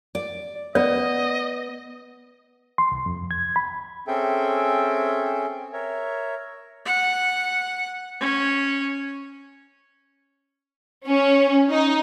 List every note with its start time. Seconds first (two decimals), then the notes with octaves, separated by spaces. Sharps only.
0.15 D5
0.75 B3 D5 D#5
2.78 C6
2.92 C2
3.06 F2
3.31 G#6
3.56 B5
4.07 C4 C#4 G#4 A4 E5 G5
5.73 A#4 C#5 E5
6.86 F#5
8.20 C#4
11.06 C#4
11.71 D#4